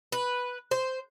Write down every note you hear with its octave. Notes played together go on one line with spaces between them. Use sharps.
B4
C5